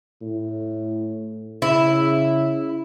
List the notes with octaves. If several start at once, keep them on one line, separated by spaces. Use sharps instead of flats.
A2
C#3 E4